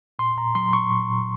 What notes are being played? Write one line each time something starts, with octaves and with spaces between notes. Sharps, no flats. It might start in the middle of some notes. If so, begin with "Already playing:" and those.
A#2 C6
A#2 A#5
F#3 C6
A#2 C#6
A#2
A#2